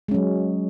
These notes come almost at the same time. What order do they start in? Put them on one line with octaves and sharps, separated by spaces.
G#3 C#4 F#3